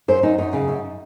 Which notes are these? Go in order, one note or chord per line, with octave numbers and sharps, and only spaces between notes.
F#2 C5
F#2 D#4
F#2 D#4
C#3
F#2